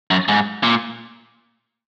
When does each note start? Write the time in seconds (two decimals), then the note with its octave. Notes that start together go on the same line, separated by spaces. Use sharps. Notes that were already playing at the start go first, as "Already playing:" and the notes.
0.11 F#2
0.29 G#2
0.63 A#2